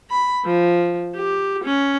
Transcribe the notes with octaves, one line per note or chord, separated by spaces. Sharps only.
B5
F3
G4
C#4